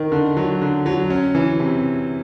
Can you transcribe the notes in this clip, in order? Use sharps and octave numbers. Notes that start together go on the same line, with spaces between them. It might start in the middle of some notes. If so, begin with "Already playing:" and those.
Already playing: D#3
D3
F#3
D3
F#3
C#4
E3
C3